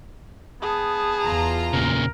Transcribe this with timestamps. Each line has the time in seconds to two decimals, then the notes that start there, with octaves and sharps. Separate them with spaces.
0.62 B3 G#4 A5
1.23 E2 F4 A#5
1.73 A#2 C#3 A#4